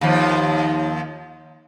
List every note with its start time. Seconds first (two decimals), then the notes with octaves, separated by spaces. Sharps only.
0.01 D#2 F3